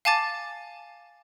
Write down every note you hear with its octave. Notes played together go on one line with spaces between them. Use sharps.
F5 G#5 A5 D6 A6